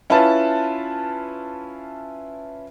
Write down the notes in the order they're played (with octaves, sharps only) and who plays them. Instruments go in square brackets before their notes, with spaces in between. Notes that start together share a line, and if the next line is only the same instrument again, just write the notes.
[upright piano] C#4 E4 F4 B4 A5